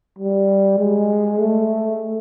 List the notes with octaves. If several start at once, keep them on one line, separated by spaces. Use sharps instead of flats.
G3
G#3
A3